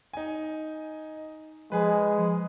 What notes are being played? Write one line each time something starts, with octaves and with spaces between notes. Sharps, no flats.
D#4 G#5
F3 G#3 G#4 B4